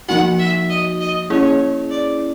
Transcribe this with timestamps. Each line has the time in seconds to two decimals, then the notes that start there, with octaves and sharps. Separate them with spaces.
0.09 F3 A#3 D#4 F#4 F#5
0.39 E5
0.69 D#5
1.00 D#5
1.30 A#3 C#4 E4 G#4 C#5
1.91 D5